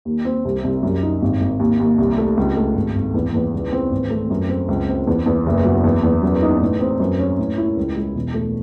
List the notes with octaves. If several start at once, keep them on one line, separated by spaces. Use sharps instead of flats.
D#2
C4
C2
C2
F#2
D#4
G#1
G#1
D#2
D#2
C2
A3
C#2
A3
G#1
G#1
E2
E2
C#2
C4
G#1
A3
F#2
C4
C#2
C4
E2
E2
F#1
F#3
E2
E2
F#2
D#4
A2
C4
F#2
C#4
A2
E4
C#2
G#3
E1
A3